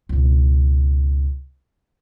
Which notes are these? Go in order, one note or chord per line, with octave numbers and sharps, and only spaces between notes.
C#2 B2